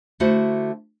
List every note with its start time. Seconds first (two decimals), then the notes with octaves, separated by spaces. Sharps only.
0.20 D3 A3 E4 F#4 C5